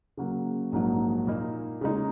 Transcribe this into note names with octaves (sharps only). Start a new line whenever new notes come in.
C#3 F#3 A#3
A#1 G#2 F#3 A#3 D#4
A#2 A#3 D#4
C#3 G#3 D#4